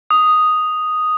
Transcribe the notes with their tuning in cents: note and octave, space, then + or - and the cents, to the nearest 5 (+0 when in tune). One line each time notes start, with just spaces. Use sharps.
D#6 +0